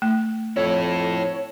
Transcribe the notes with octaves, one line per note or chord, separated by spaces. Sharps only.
A3
F2 E4 A4 C#5